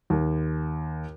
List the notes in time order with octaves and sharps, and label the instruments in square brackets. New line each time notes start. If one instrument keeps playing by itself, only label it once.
[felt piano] D#2